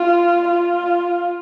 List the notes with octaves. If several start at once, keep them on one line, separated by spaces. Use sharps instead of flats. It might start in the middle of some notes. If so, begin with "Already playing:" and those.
Already playing: F4
F4